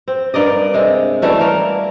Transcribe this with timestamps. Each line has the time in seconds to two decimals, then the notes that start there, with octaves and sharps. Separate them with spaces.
0.08 C4
0.34 G2 A#4 D5 D#5
0.74 C3 G#3 C4
1.22 E3 G3 A3 C#4
1.40 A#3 A#4